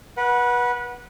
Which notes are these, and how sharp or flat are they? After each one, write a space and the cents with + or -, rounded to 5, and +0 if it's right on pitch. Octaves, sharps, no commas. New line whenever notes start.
B4 -25 F#5 -5